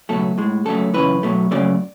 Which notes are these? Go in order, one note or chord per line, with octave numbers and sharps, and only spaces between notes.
C#2 B2 F#3 A3 A4
A2 G#3
C#2 C#3 F#3 A3 A4
F#2 C#3 E3 B4
B1 B2 F#3 A3
F#2 C#3 F#3 A3 D5